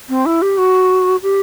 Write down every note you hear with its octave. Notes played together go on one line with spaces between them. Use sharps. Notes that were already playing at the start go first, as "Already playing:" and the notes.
C4
E4
G4
F#4
G4